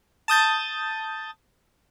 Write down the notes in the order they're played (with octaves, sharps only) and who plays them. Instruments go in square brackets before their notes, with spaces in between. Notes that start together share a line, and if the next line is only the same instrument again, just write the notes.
[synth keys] A5 D#6 G6 A6